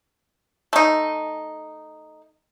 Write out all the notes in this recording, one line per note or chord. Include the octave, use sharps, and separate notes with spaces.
A3 D#4